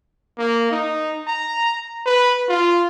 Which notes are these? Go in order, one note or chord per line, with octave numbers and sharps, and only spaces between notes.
A#3
D#4
A#5
B4
F4